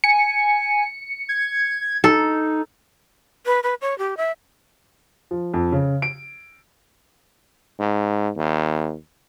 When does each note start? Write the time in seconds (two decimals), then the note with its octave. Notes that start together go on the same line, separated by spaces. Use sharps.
0.04 G#5 C#7
1.29 G#6
2.04 D#4 A4
3.46 B4
3.63 B4
3.81 C#5
3.98 G4
4.17 E5
5.31 F3
5.54 F2
5.72 C#3
6.02 D7
7.80 G#2
8.37 D#2